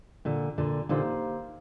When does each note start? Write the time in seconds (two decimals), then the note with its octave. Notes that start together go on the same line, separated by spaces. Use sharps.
0.25 A#2 D3
0.58 A#2 D3
0.89 A#2 D3 A#3 D#4 G4 C5 F5